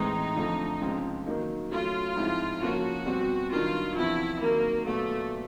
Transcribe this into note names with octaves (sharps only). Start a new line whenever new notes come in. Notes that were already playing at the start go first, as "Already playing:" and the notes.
Already playing: A2 E3 G#3 C4 D#4
F2 D3 F3 A3
C#2 C3 F3 G#3 C4
D#3 F#3 A#3 D#4
C#3 F#3 A3 C#4 F4
G#2 F3 G#3 C4 E4
C#3 F3 A#3 C#4 F#4
B2 G3 C4
G2 D#3 F#3 F4
E2 C3 F3 E4
C3 D#3 F#3 A#3
A#2 F#3 A3 B3